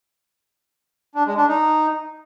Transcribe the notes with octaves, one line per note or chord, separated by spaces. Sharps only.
D4
G#3
D4
D#4